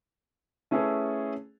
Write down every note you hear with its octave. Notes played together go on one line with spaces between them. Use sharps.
A3 C#4 E4 G#4 A4 B4